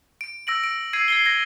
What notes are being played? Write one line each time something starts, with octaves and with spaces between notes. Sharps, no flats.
D7
E6 A#6 D7 F#7
D7
E6 G#6 C7 D#7
G#6 C7 G7
G#6 A#6